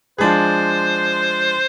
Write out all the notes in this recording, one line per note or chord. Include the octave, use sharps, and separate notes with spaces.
F3 G#3 D4 G#4 C5